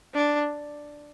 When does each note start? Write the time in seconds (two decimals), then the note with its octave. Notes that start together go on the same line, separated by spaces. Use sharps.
0.14 D4